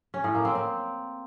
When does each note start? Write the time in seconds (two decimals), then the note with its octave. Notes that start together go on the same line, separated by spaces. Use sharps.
0.14 C#4
0.24 A2
0.34 A#3
0.45 C4
0.55 C4